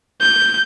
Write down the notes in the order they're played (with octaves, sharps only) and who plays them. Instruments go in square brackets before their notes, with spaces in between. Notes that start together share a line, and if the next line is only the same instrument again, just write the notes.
[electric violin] G6